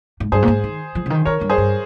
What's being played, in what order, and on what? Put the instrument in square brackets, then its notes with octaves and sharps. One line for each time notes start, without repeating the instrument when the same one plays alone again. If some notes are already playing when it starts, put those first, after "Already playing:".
[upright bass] G#2
[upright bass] G2 [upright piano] G#4 C5
[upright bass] A#2
G#2
D#3
F3
C#3
D#3
[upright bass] D#3 [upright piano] A#4 C#5
[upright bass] G2
[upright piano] G#4 C5
[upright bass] G2